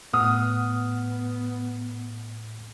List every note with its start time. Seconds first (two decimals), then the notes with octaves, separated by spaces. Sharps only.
0.13 A2 B3 F#5 D#6 F6